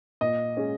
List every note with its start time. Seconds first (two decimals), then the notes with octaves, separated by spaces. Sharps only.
0.21 A#2 D#5
0.57 G#3 C#4